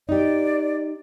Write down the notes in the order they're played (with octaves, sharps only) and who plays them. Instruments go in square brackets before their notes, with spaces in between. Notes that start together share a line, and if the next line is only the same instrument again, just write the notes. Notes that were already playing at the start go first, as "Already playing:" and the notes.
[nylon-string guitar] D#4 G4 [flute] D5